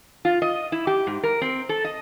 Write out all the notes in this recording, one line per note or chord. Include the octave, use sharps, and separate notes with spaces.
F4
D#5
E4
G4
G#2
A#4
C4
A4
D#5